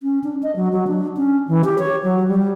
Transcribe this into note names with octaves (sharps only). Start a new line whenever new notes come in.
C#4
D4
D#5
F#3
F#3
D4
C#4
E3
G4
C#5
F#3
G3